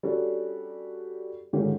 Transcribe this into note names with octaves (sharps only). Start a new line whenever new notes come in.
G3 C#4 D4 F#4 A4 D5
G#2 D3 D#3 C#4 F4 G4